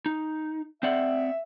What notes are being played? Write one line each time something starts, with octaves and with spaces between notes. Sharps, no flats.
D#4
C4 D5 E5 F#5